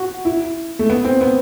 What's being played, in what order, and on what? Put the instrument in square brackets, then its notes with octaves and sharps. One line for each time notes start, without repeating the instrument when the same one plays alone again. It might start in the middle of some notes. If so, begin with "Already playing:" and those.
Already playing: [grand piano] F#4
E4
A3
B3
C4
B3